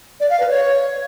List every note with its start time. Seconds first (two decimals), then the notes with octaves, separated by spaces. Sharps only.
0.20 D5
0.30 F5
0.40 B4
0.50 C#5